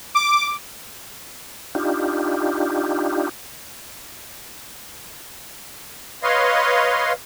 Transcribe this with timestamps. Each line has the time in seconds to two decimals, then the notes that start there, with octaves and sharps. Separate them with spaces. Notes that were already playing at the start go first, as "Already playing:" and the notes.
0.15 D6
1.75 D4 D#4 F4 G4
6.23 B4 C#5 D#5 F5 C6